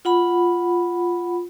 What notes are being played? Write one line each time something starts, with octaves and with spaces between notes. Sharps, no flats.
F4 F#5 B5